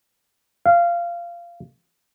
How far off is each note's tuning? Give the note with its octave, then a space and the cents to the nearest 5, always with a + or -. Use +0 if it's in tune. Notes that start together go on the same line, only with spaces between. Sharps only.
F5 -15